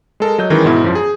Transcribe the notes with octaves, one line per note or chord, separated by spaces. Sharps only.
G#3 A4 A#4
F#3 D#5 G6
D#3 E3 G#3 C#4 A#4
G#2 B2 E4
F#2 F3
G#4